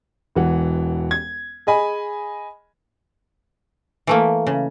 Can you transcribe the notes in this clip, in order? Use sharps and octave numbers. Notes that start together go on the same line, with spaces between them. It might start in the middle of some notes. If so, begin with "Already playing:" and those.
E1 E3 F#5
G#6
G#4 D#5 G#5 B5
E3 A3 A#3
C#3